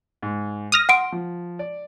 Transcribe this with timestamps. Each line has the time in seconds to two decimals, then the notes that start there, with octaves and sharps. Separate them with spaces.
0.23 G#2
0.72 D#6 F6 A#6
0.89 F#5 C6 D7
1.12 F3
1.59 D5